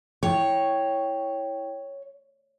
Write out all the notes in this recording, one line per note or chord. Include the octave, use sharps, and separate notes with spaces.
E4 C#5 G5 C#6